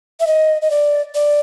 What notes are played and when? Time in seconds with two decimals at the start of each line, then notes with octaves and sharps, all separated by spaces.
0.20 E5
0.27 D#5
0.62 D#5
0.71 D5
1.15 D5